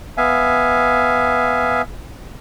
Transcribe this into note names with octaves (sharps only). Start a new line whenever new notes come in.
B3 E5 F5 G#5